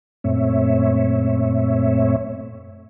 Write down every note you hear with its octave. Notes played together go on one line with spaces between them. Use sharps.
F#2 A#2 A3 C4 C#5 E5